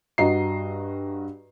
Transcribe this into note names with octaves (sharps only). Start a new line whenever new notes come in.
G2 F#4 D#5 A#5 C7